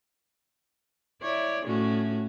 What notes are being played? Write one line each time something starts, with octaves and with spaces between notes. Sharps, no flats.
E4 C#5 D5
A2 C#4 F#4